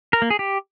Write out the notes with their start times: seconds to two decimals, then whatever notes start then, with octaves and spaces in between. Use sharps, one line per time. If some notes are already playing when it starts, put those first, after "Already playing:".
0.13 A#4
0.22 A#3
0.30 G#4
0.39 G4